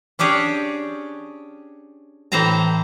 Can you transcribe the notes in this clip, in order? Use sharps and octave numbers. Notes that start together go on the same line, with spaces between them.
C#4 D4 G4 G#4 C#5
A2 E3 C4 C5 A5 A#5